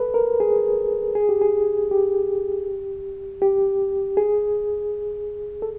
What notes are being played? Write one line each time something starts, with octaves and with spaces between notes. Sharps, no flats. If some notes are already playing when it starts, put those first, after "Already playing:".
Already playing: A4 B4
A#4
G#4
G#4
G4
G#4
G4
G4
G#4
A4